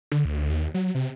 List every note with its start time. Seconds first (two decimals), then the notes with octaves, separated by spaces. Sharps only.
0.12 D3
0.25 D2
0.49 D#2
0.74 F#3
0.95 C3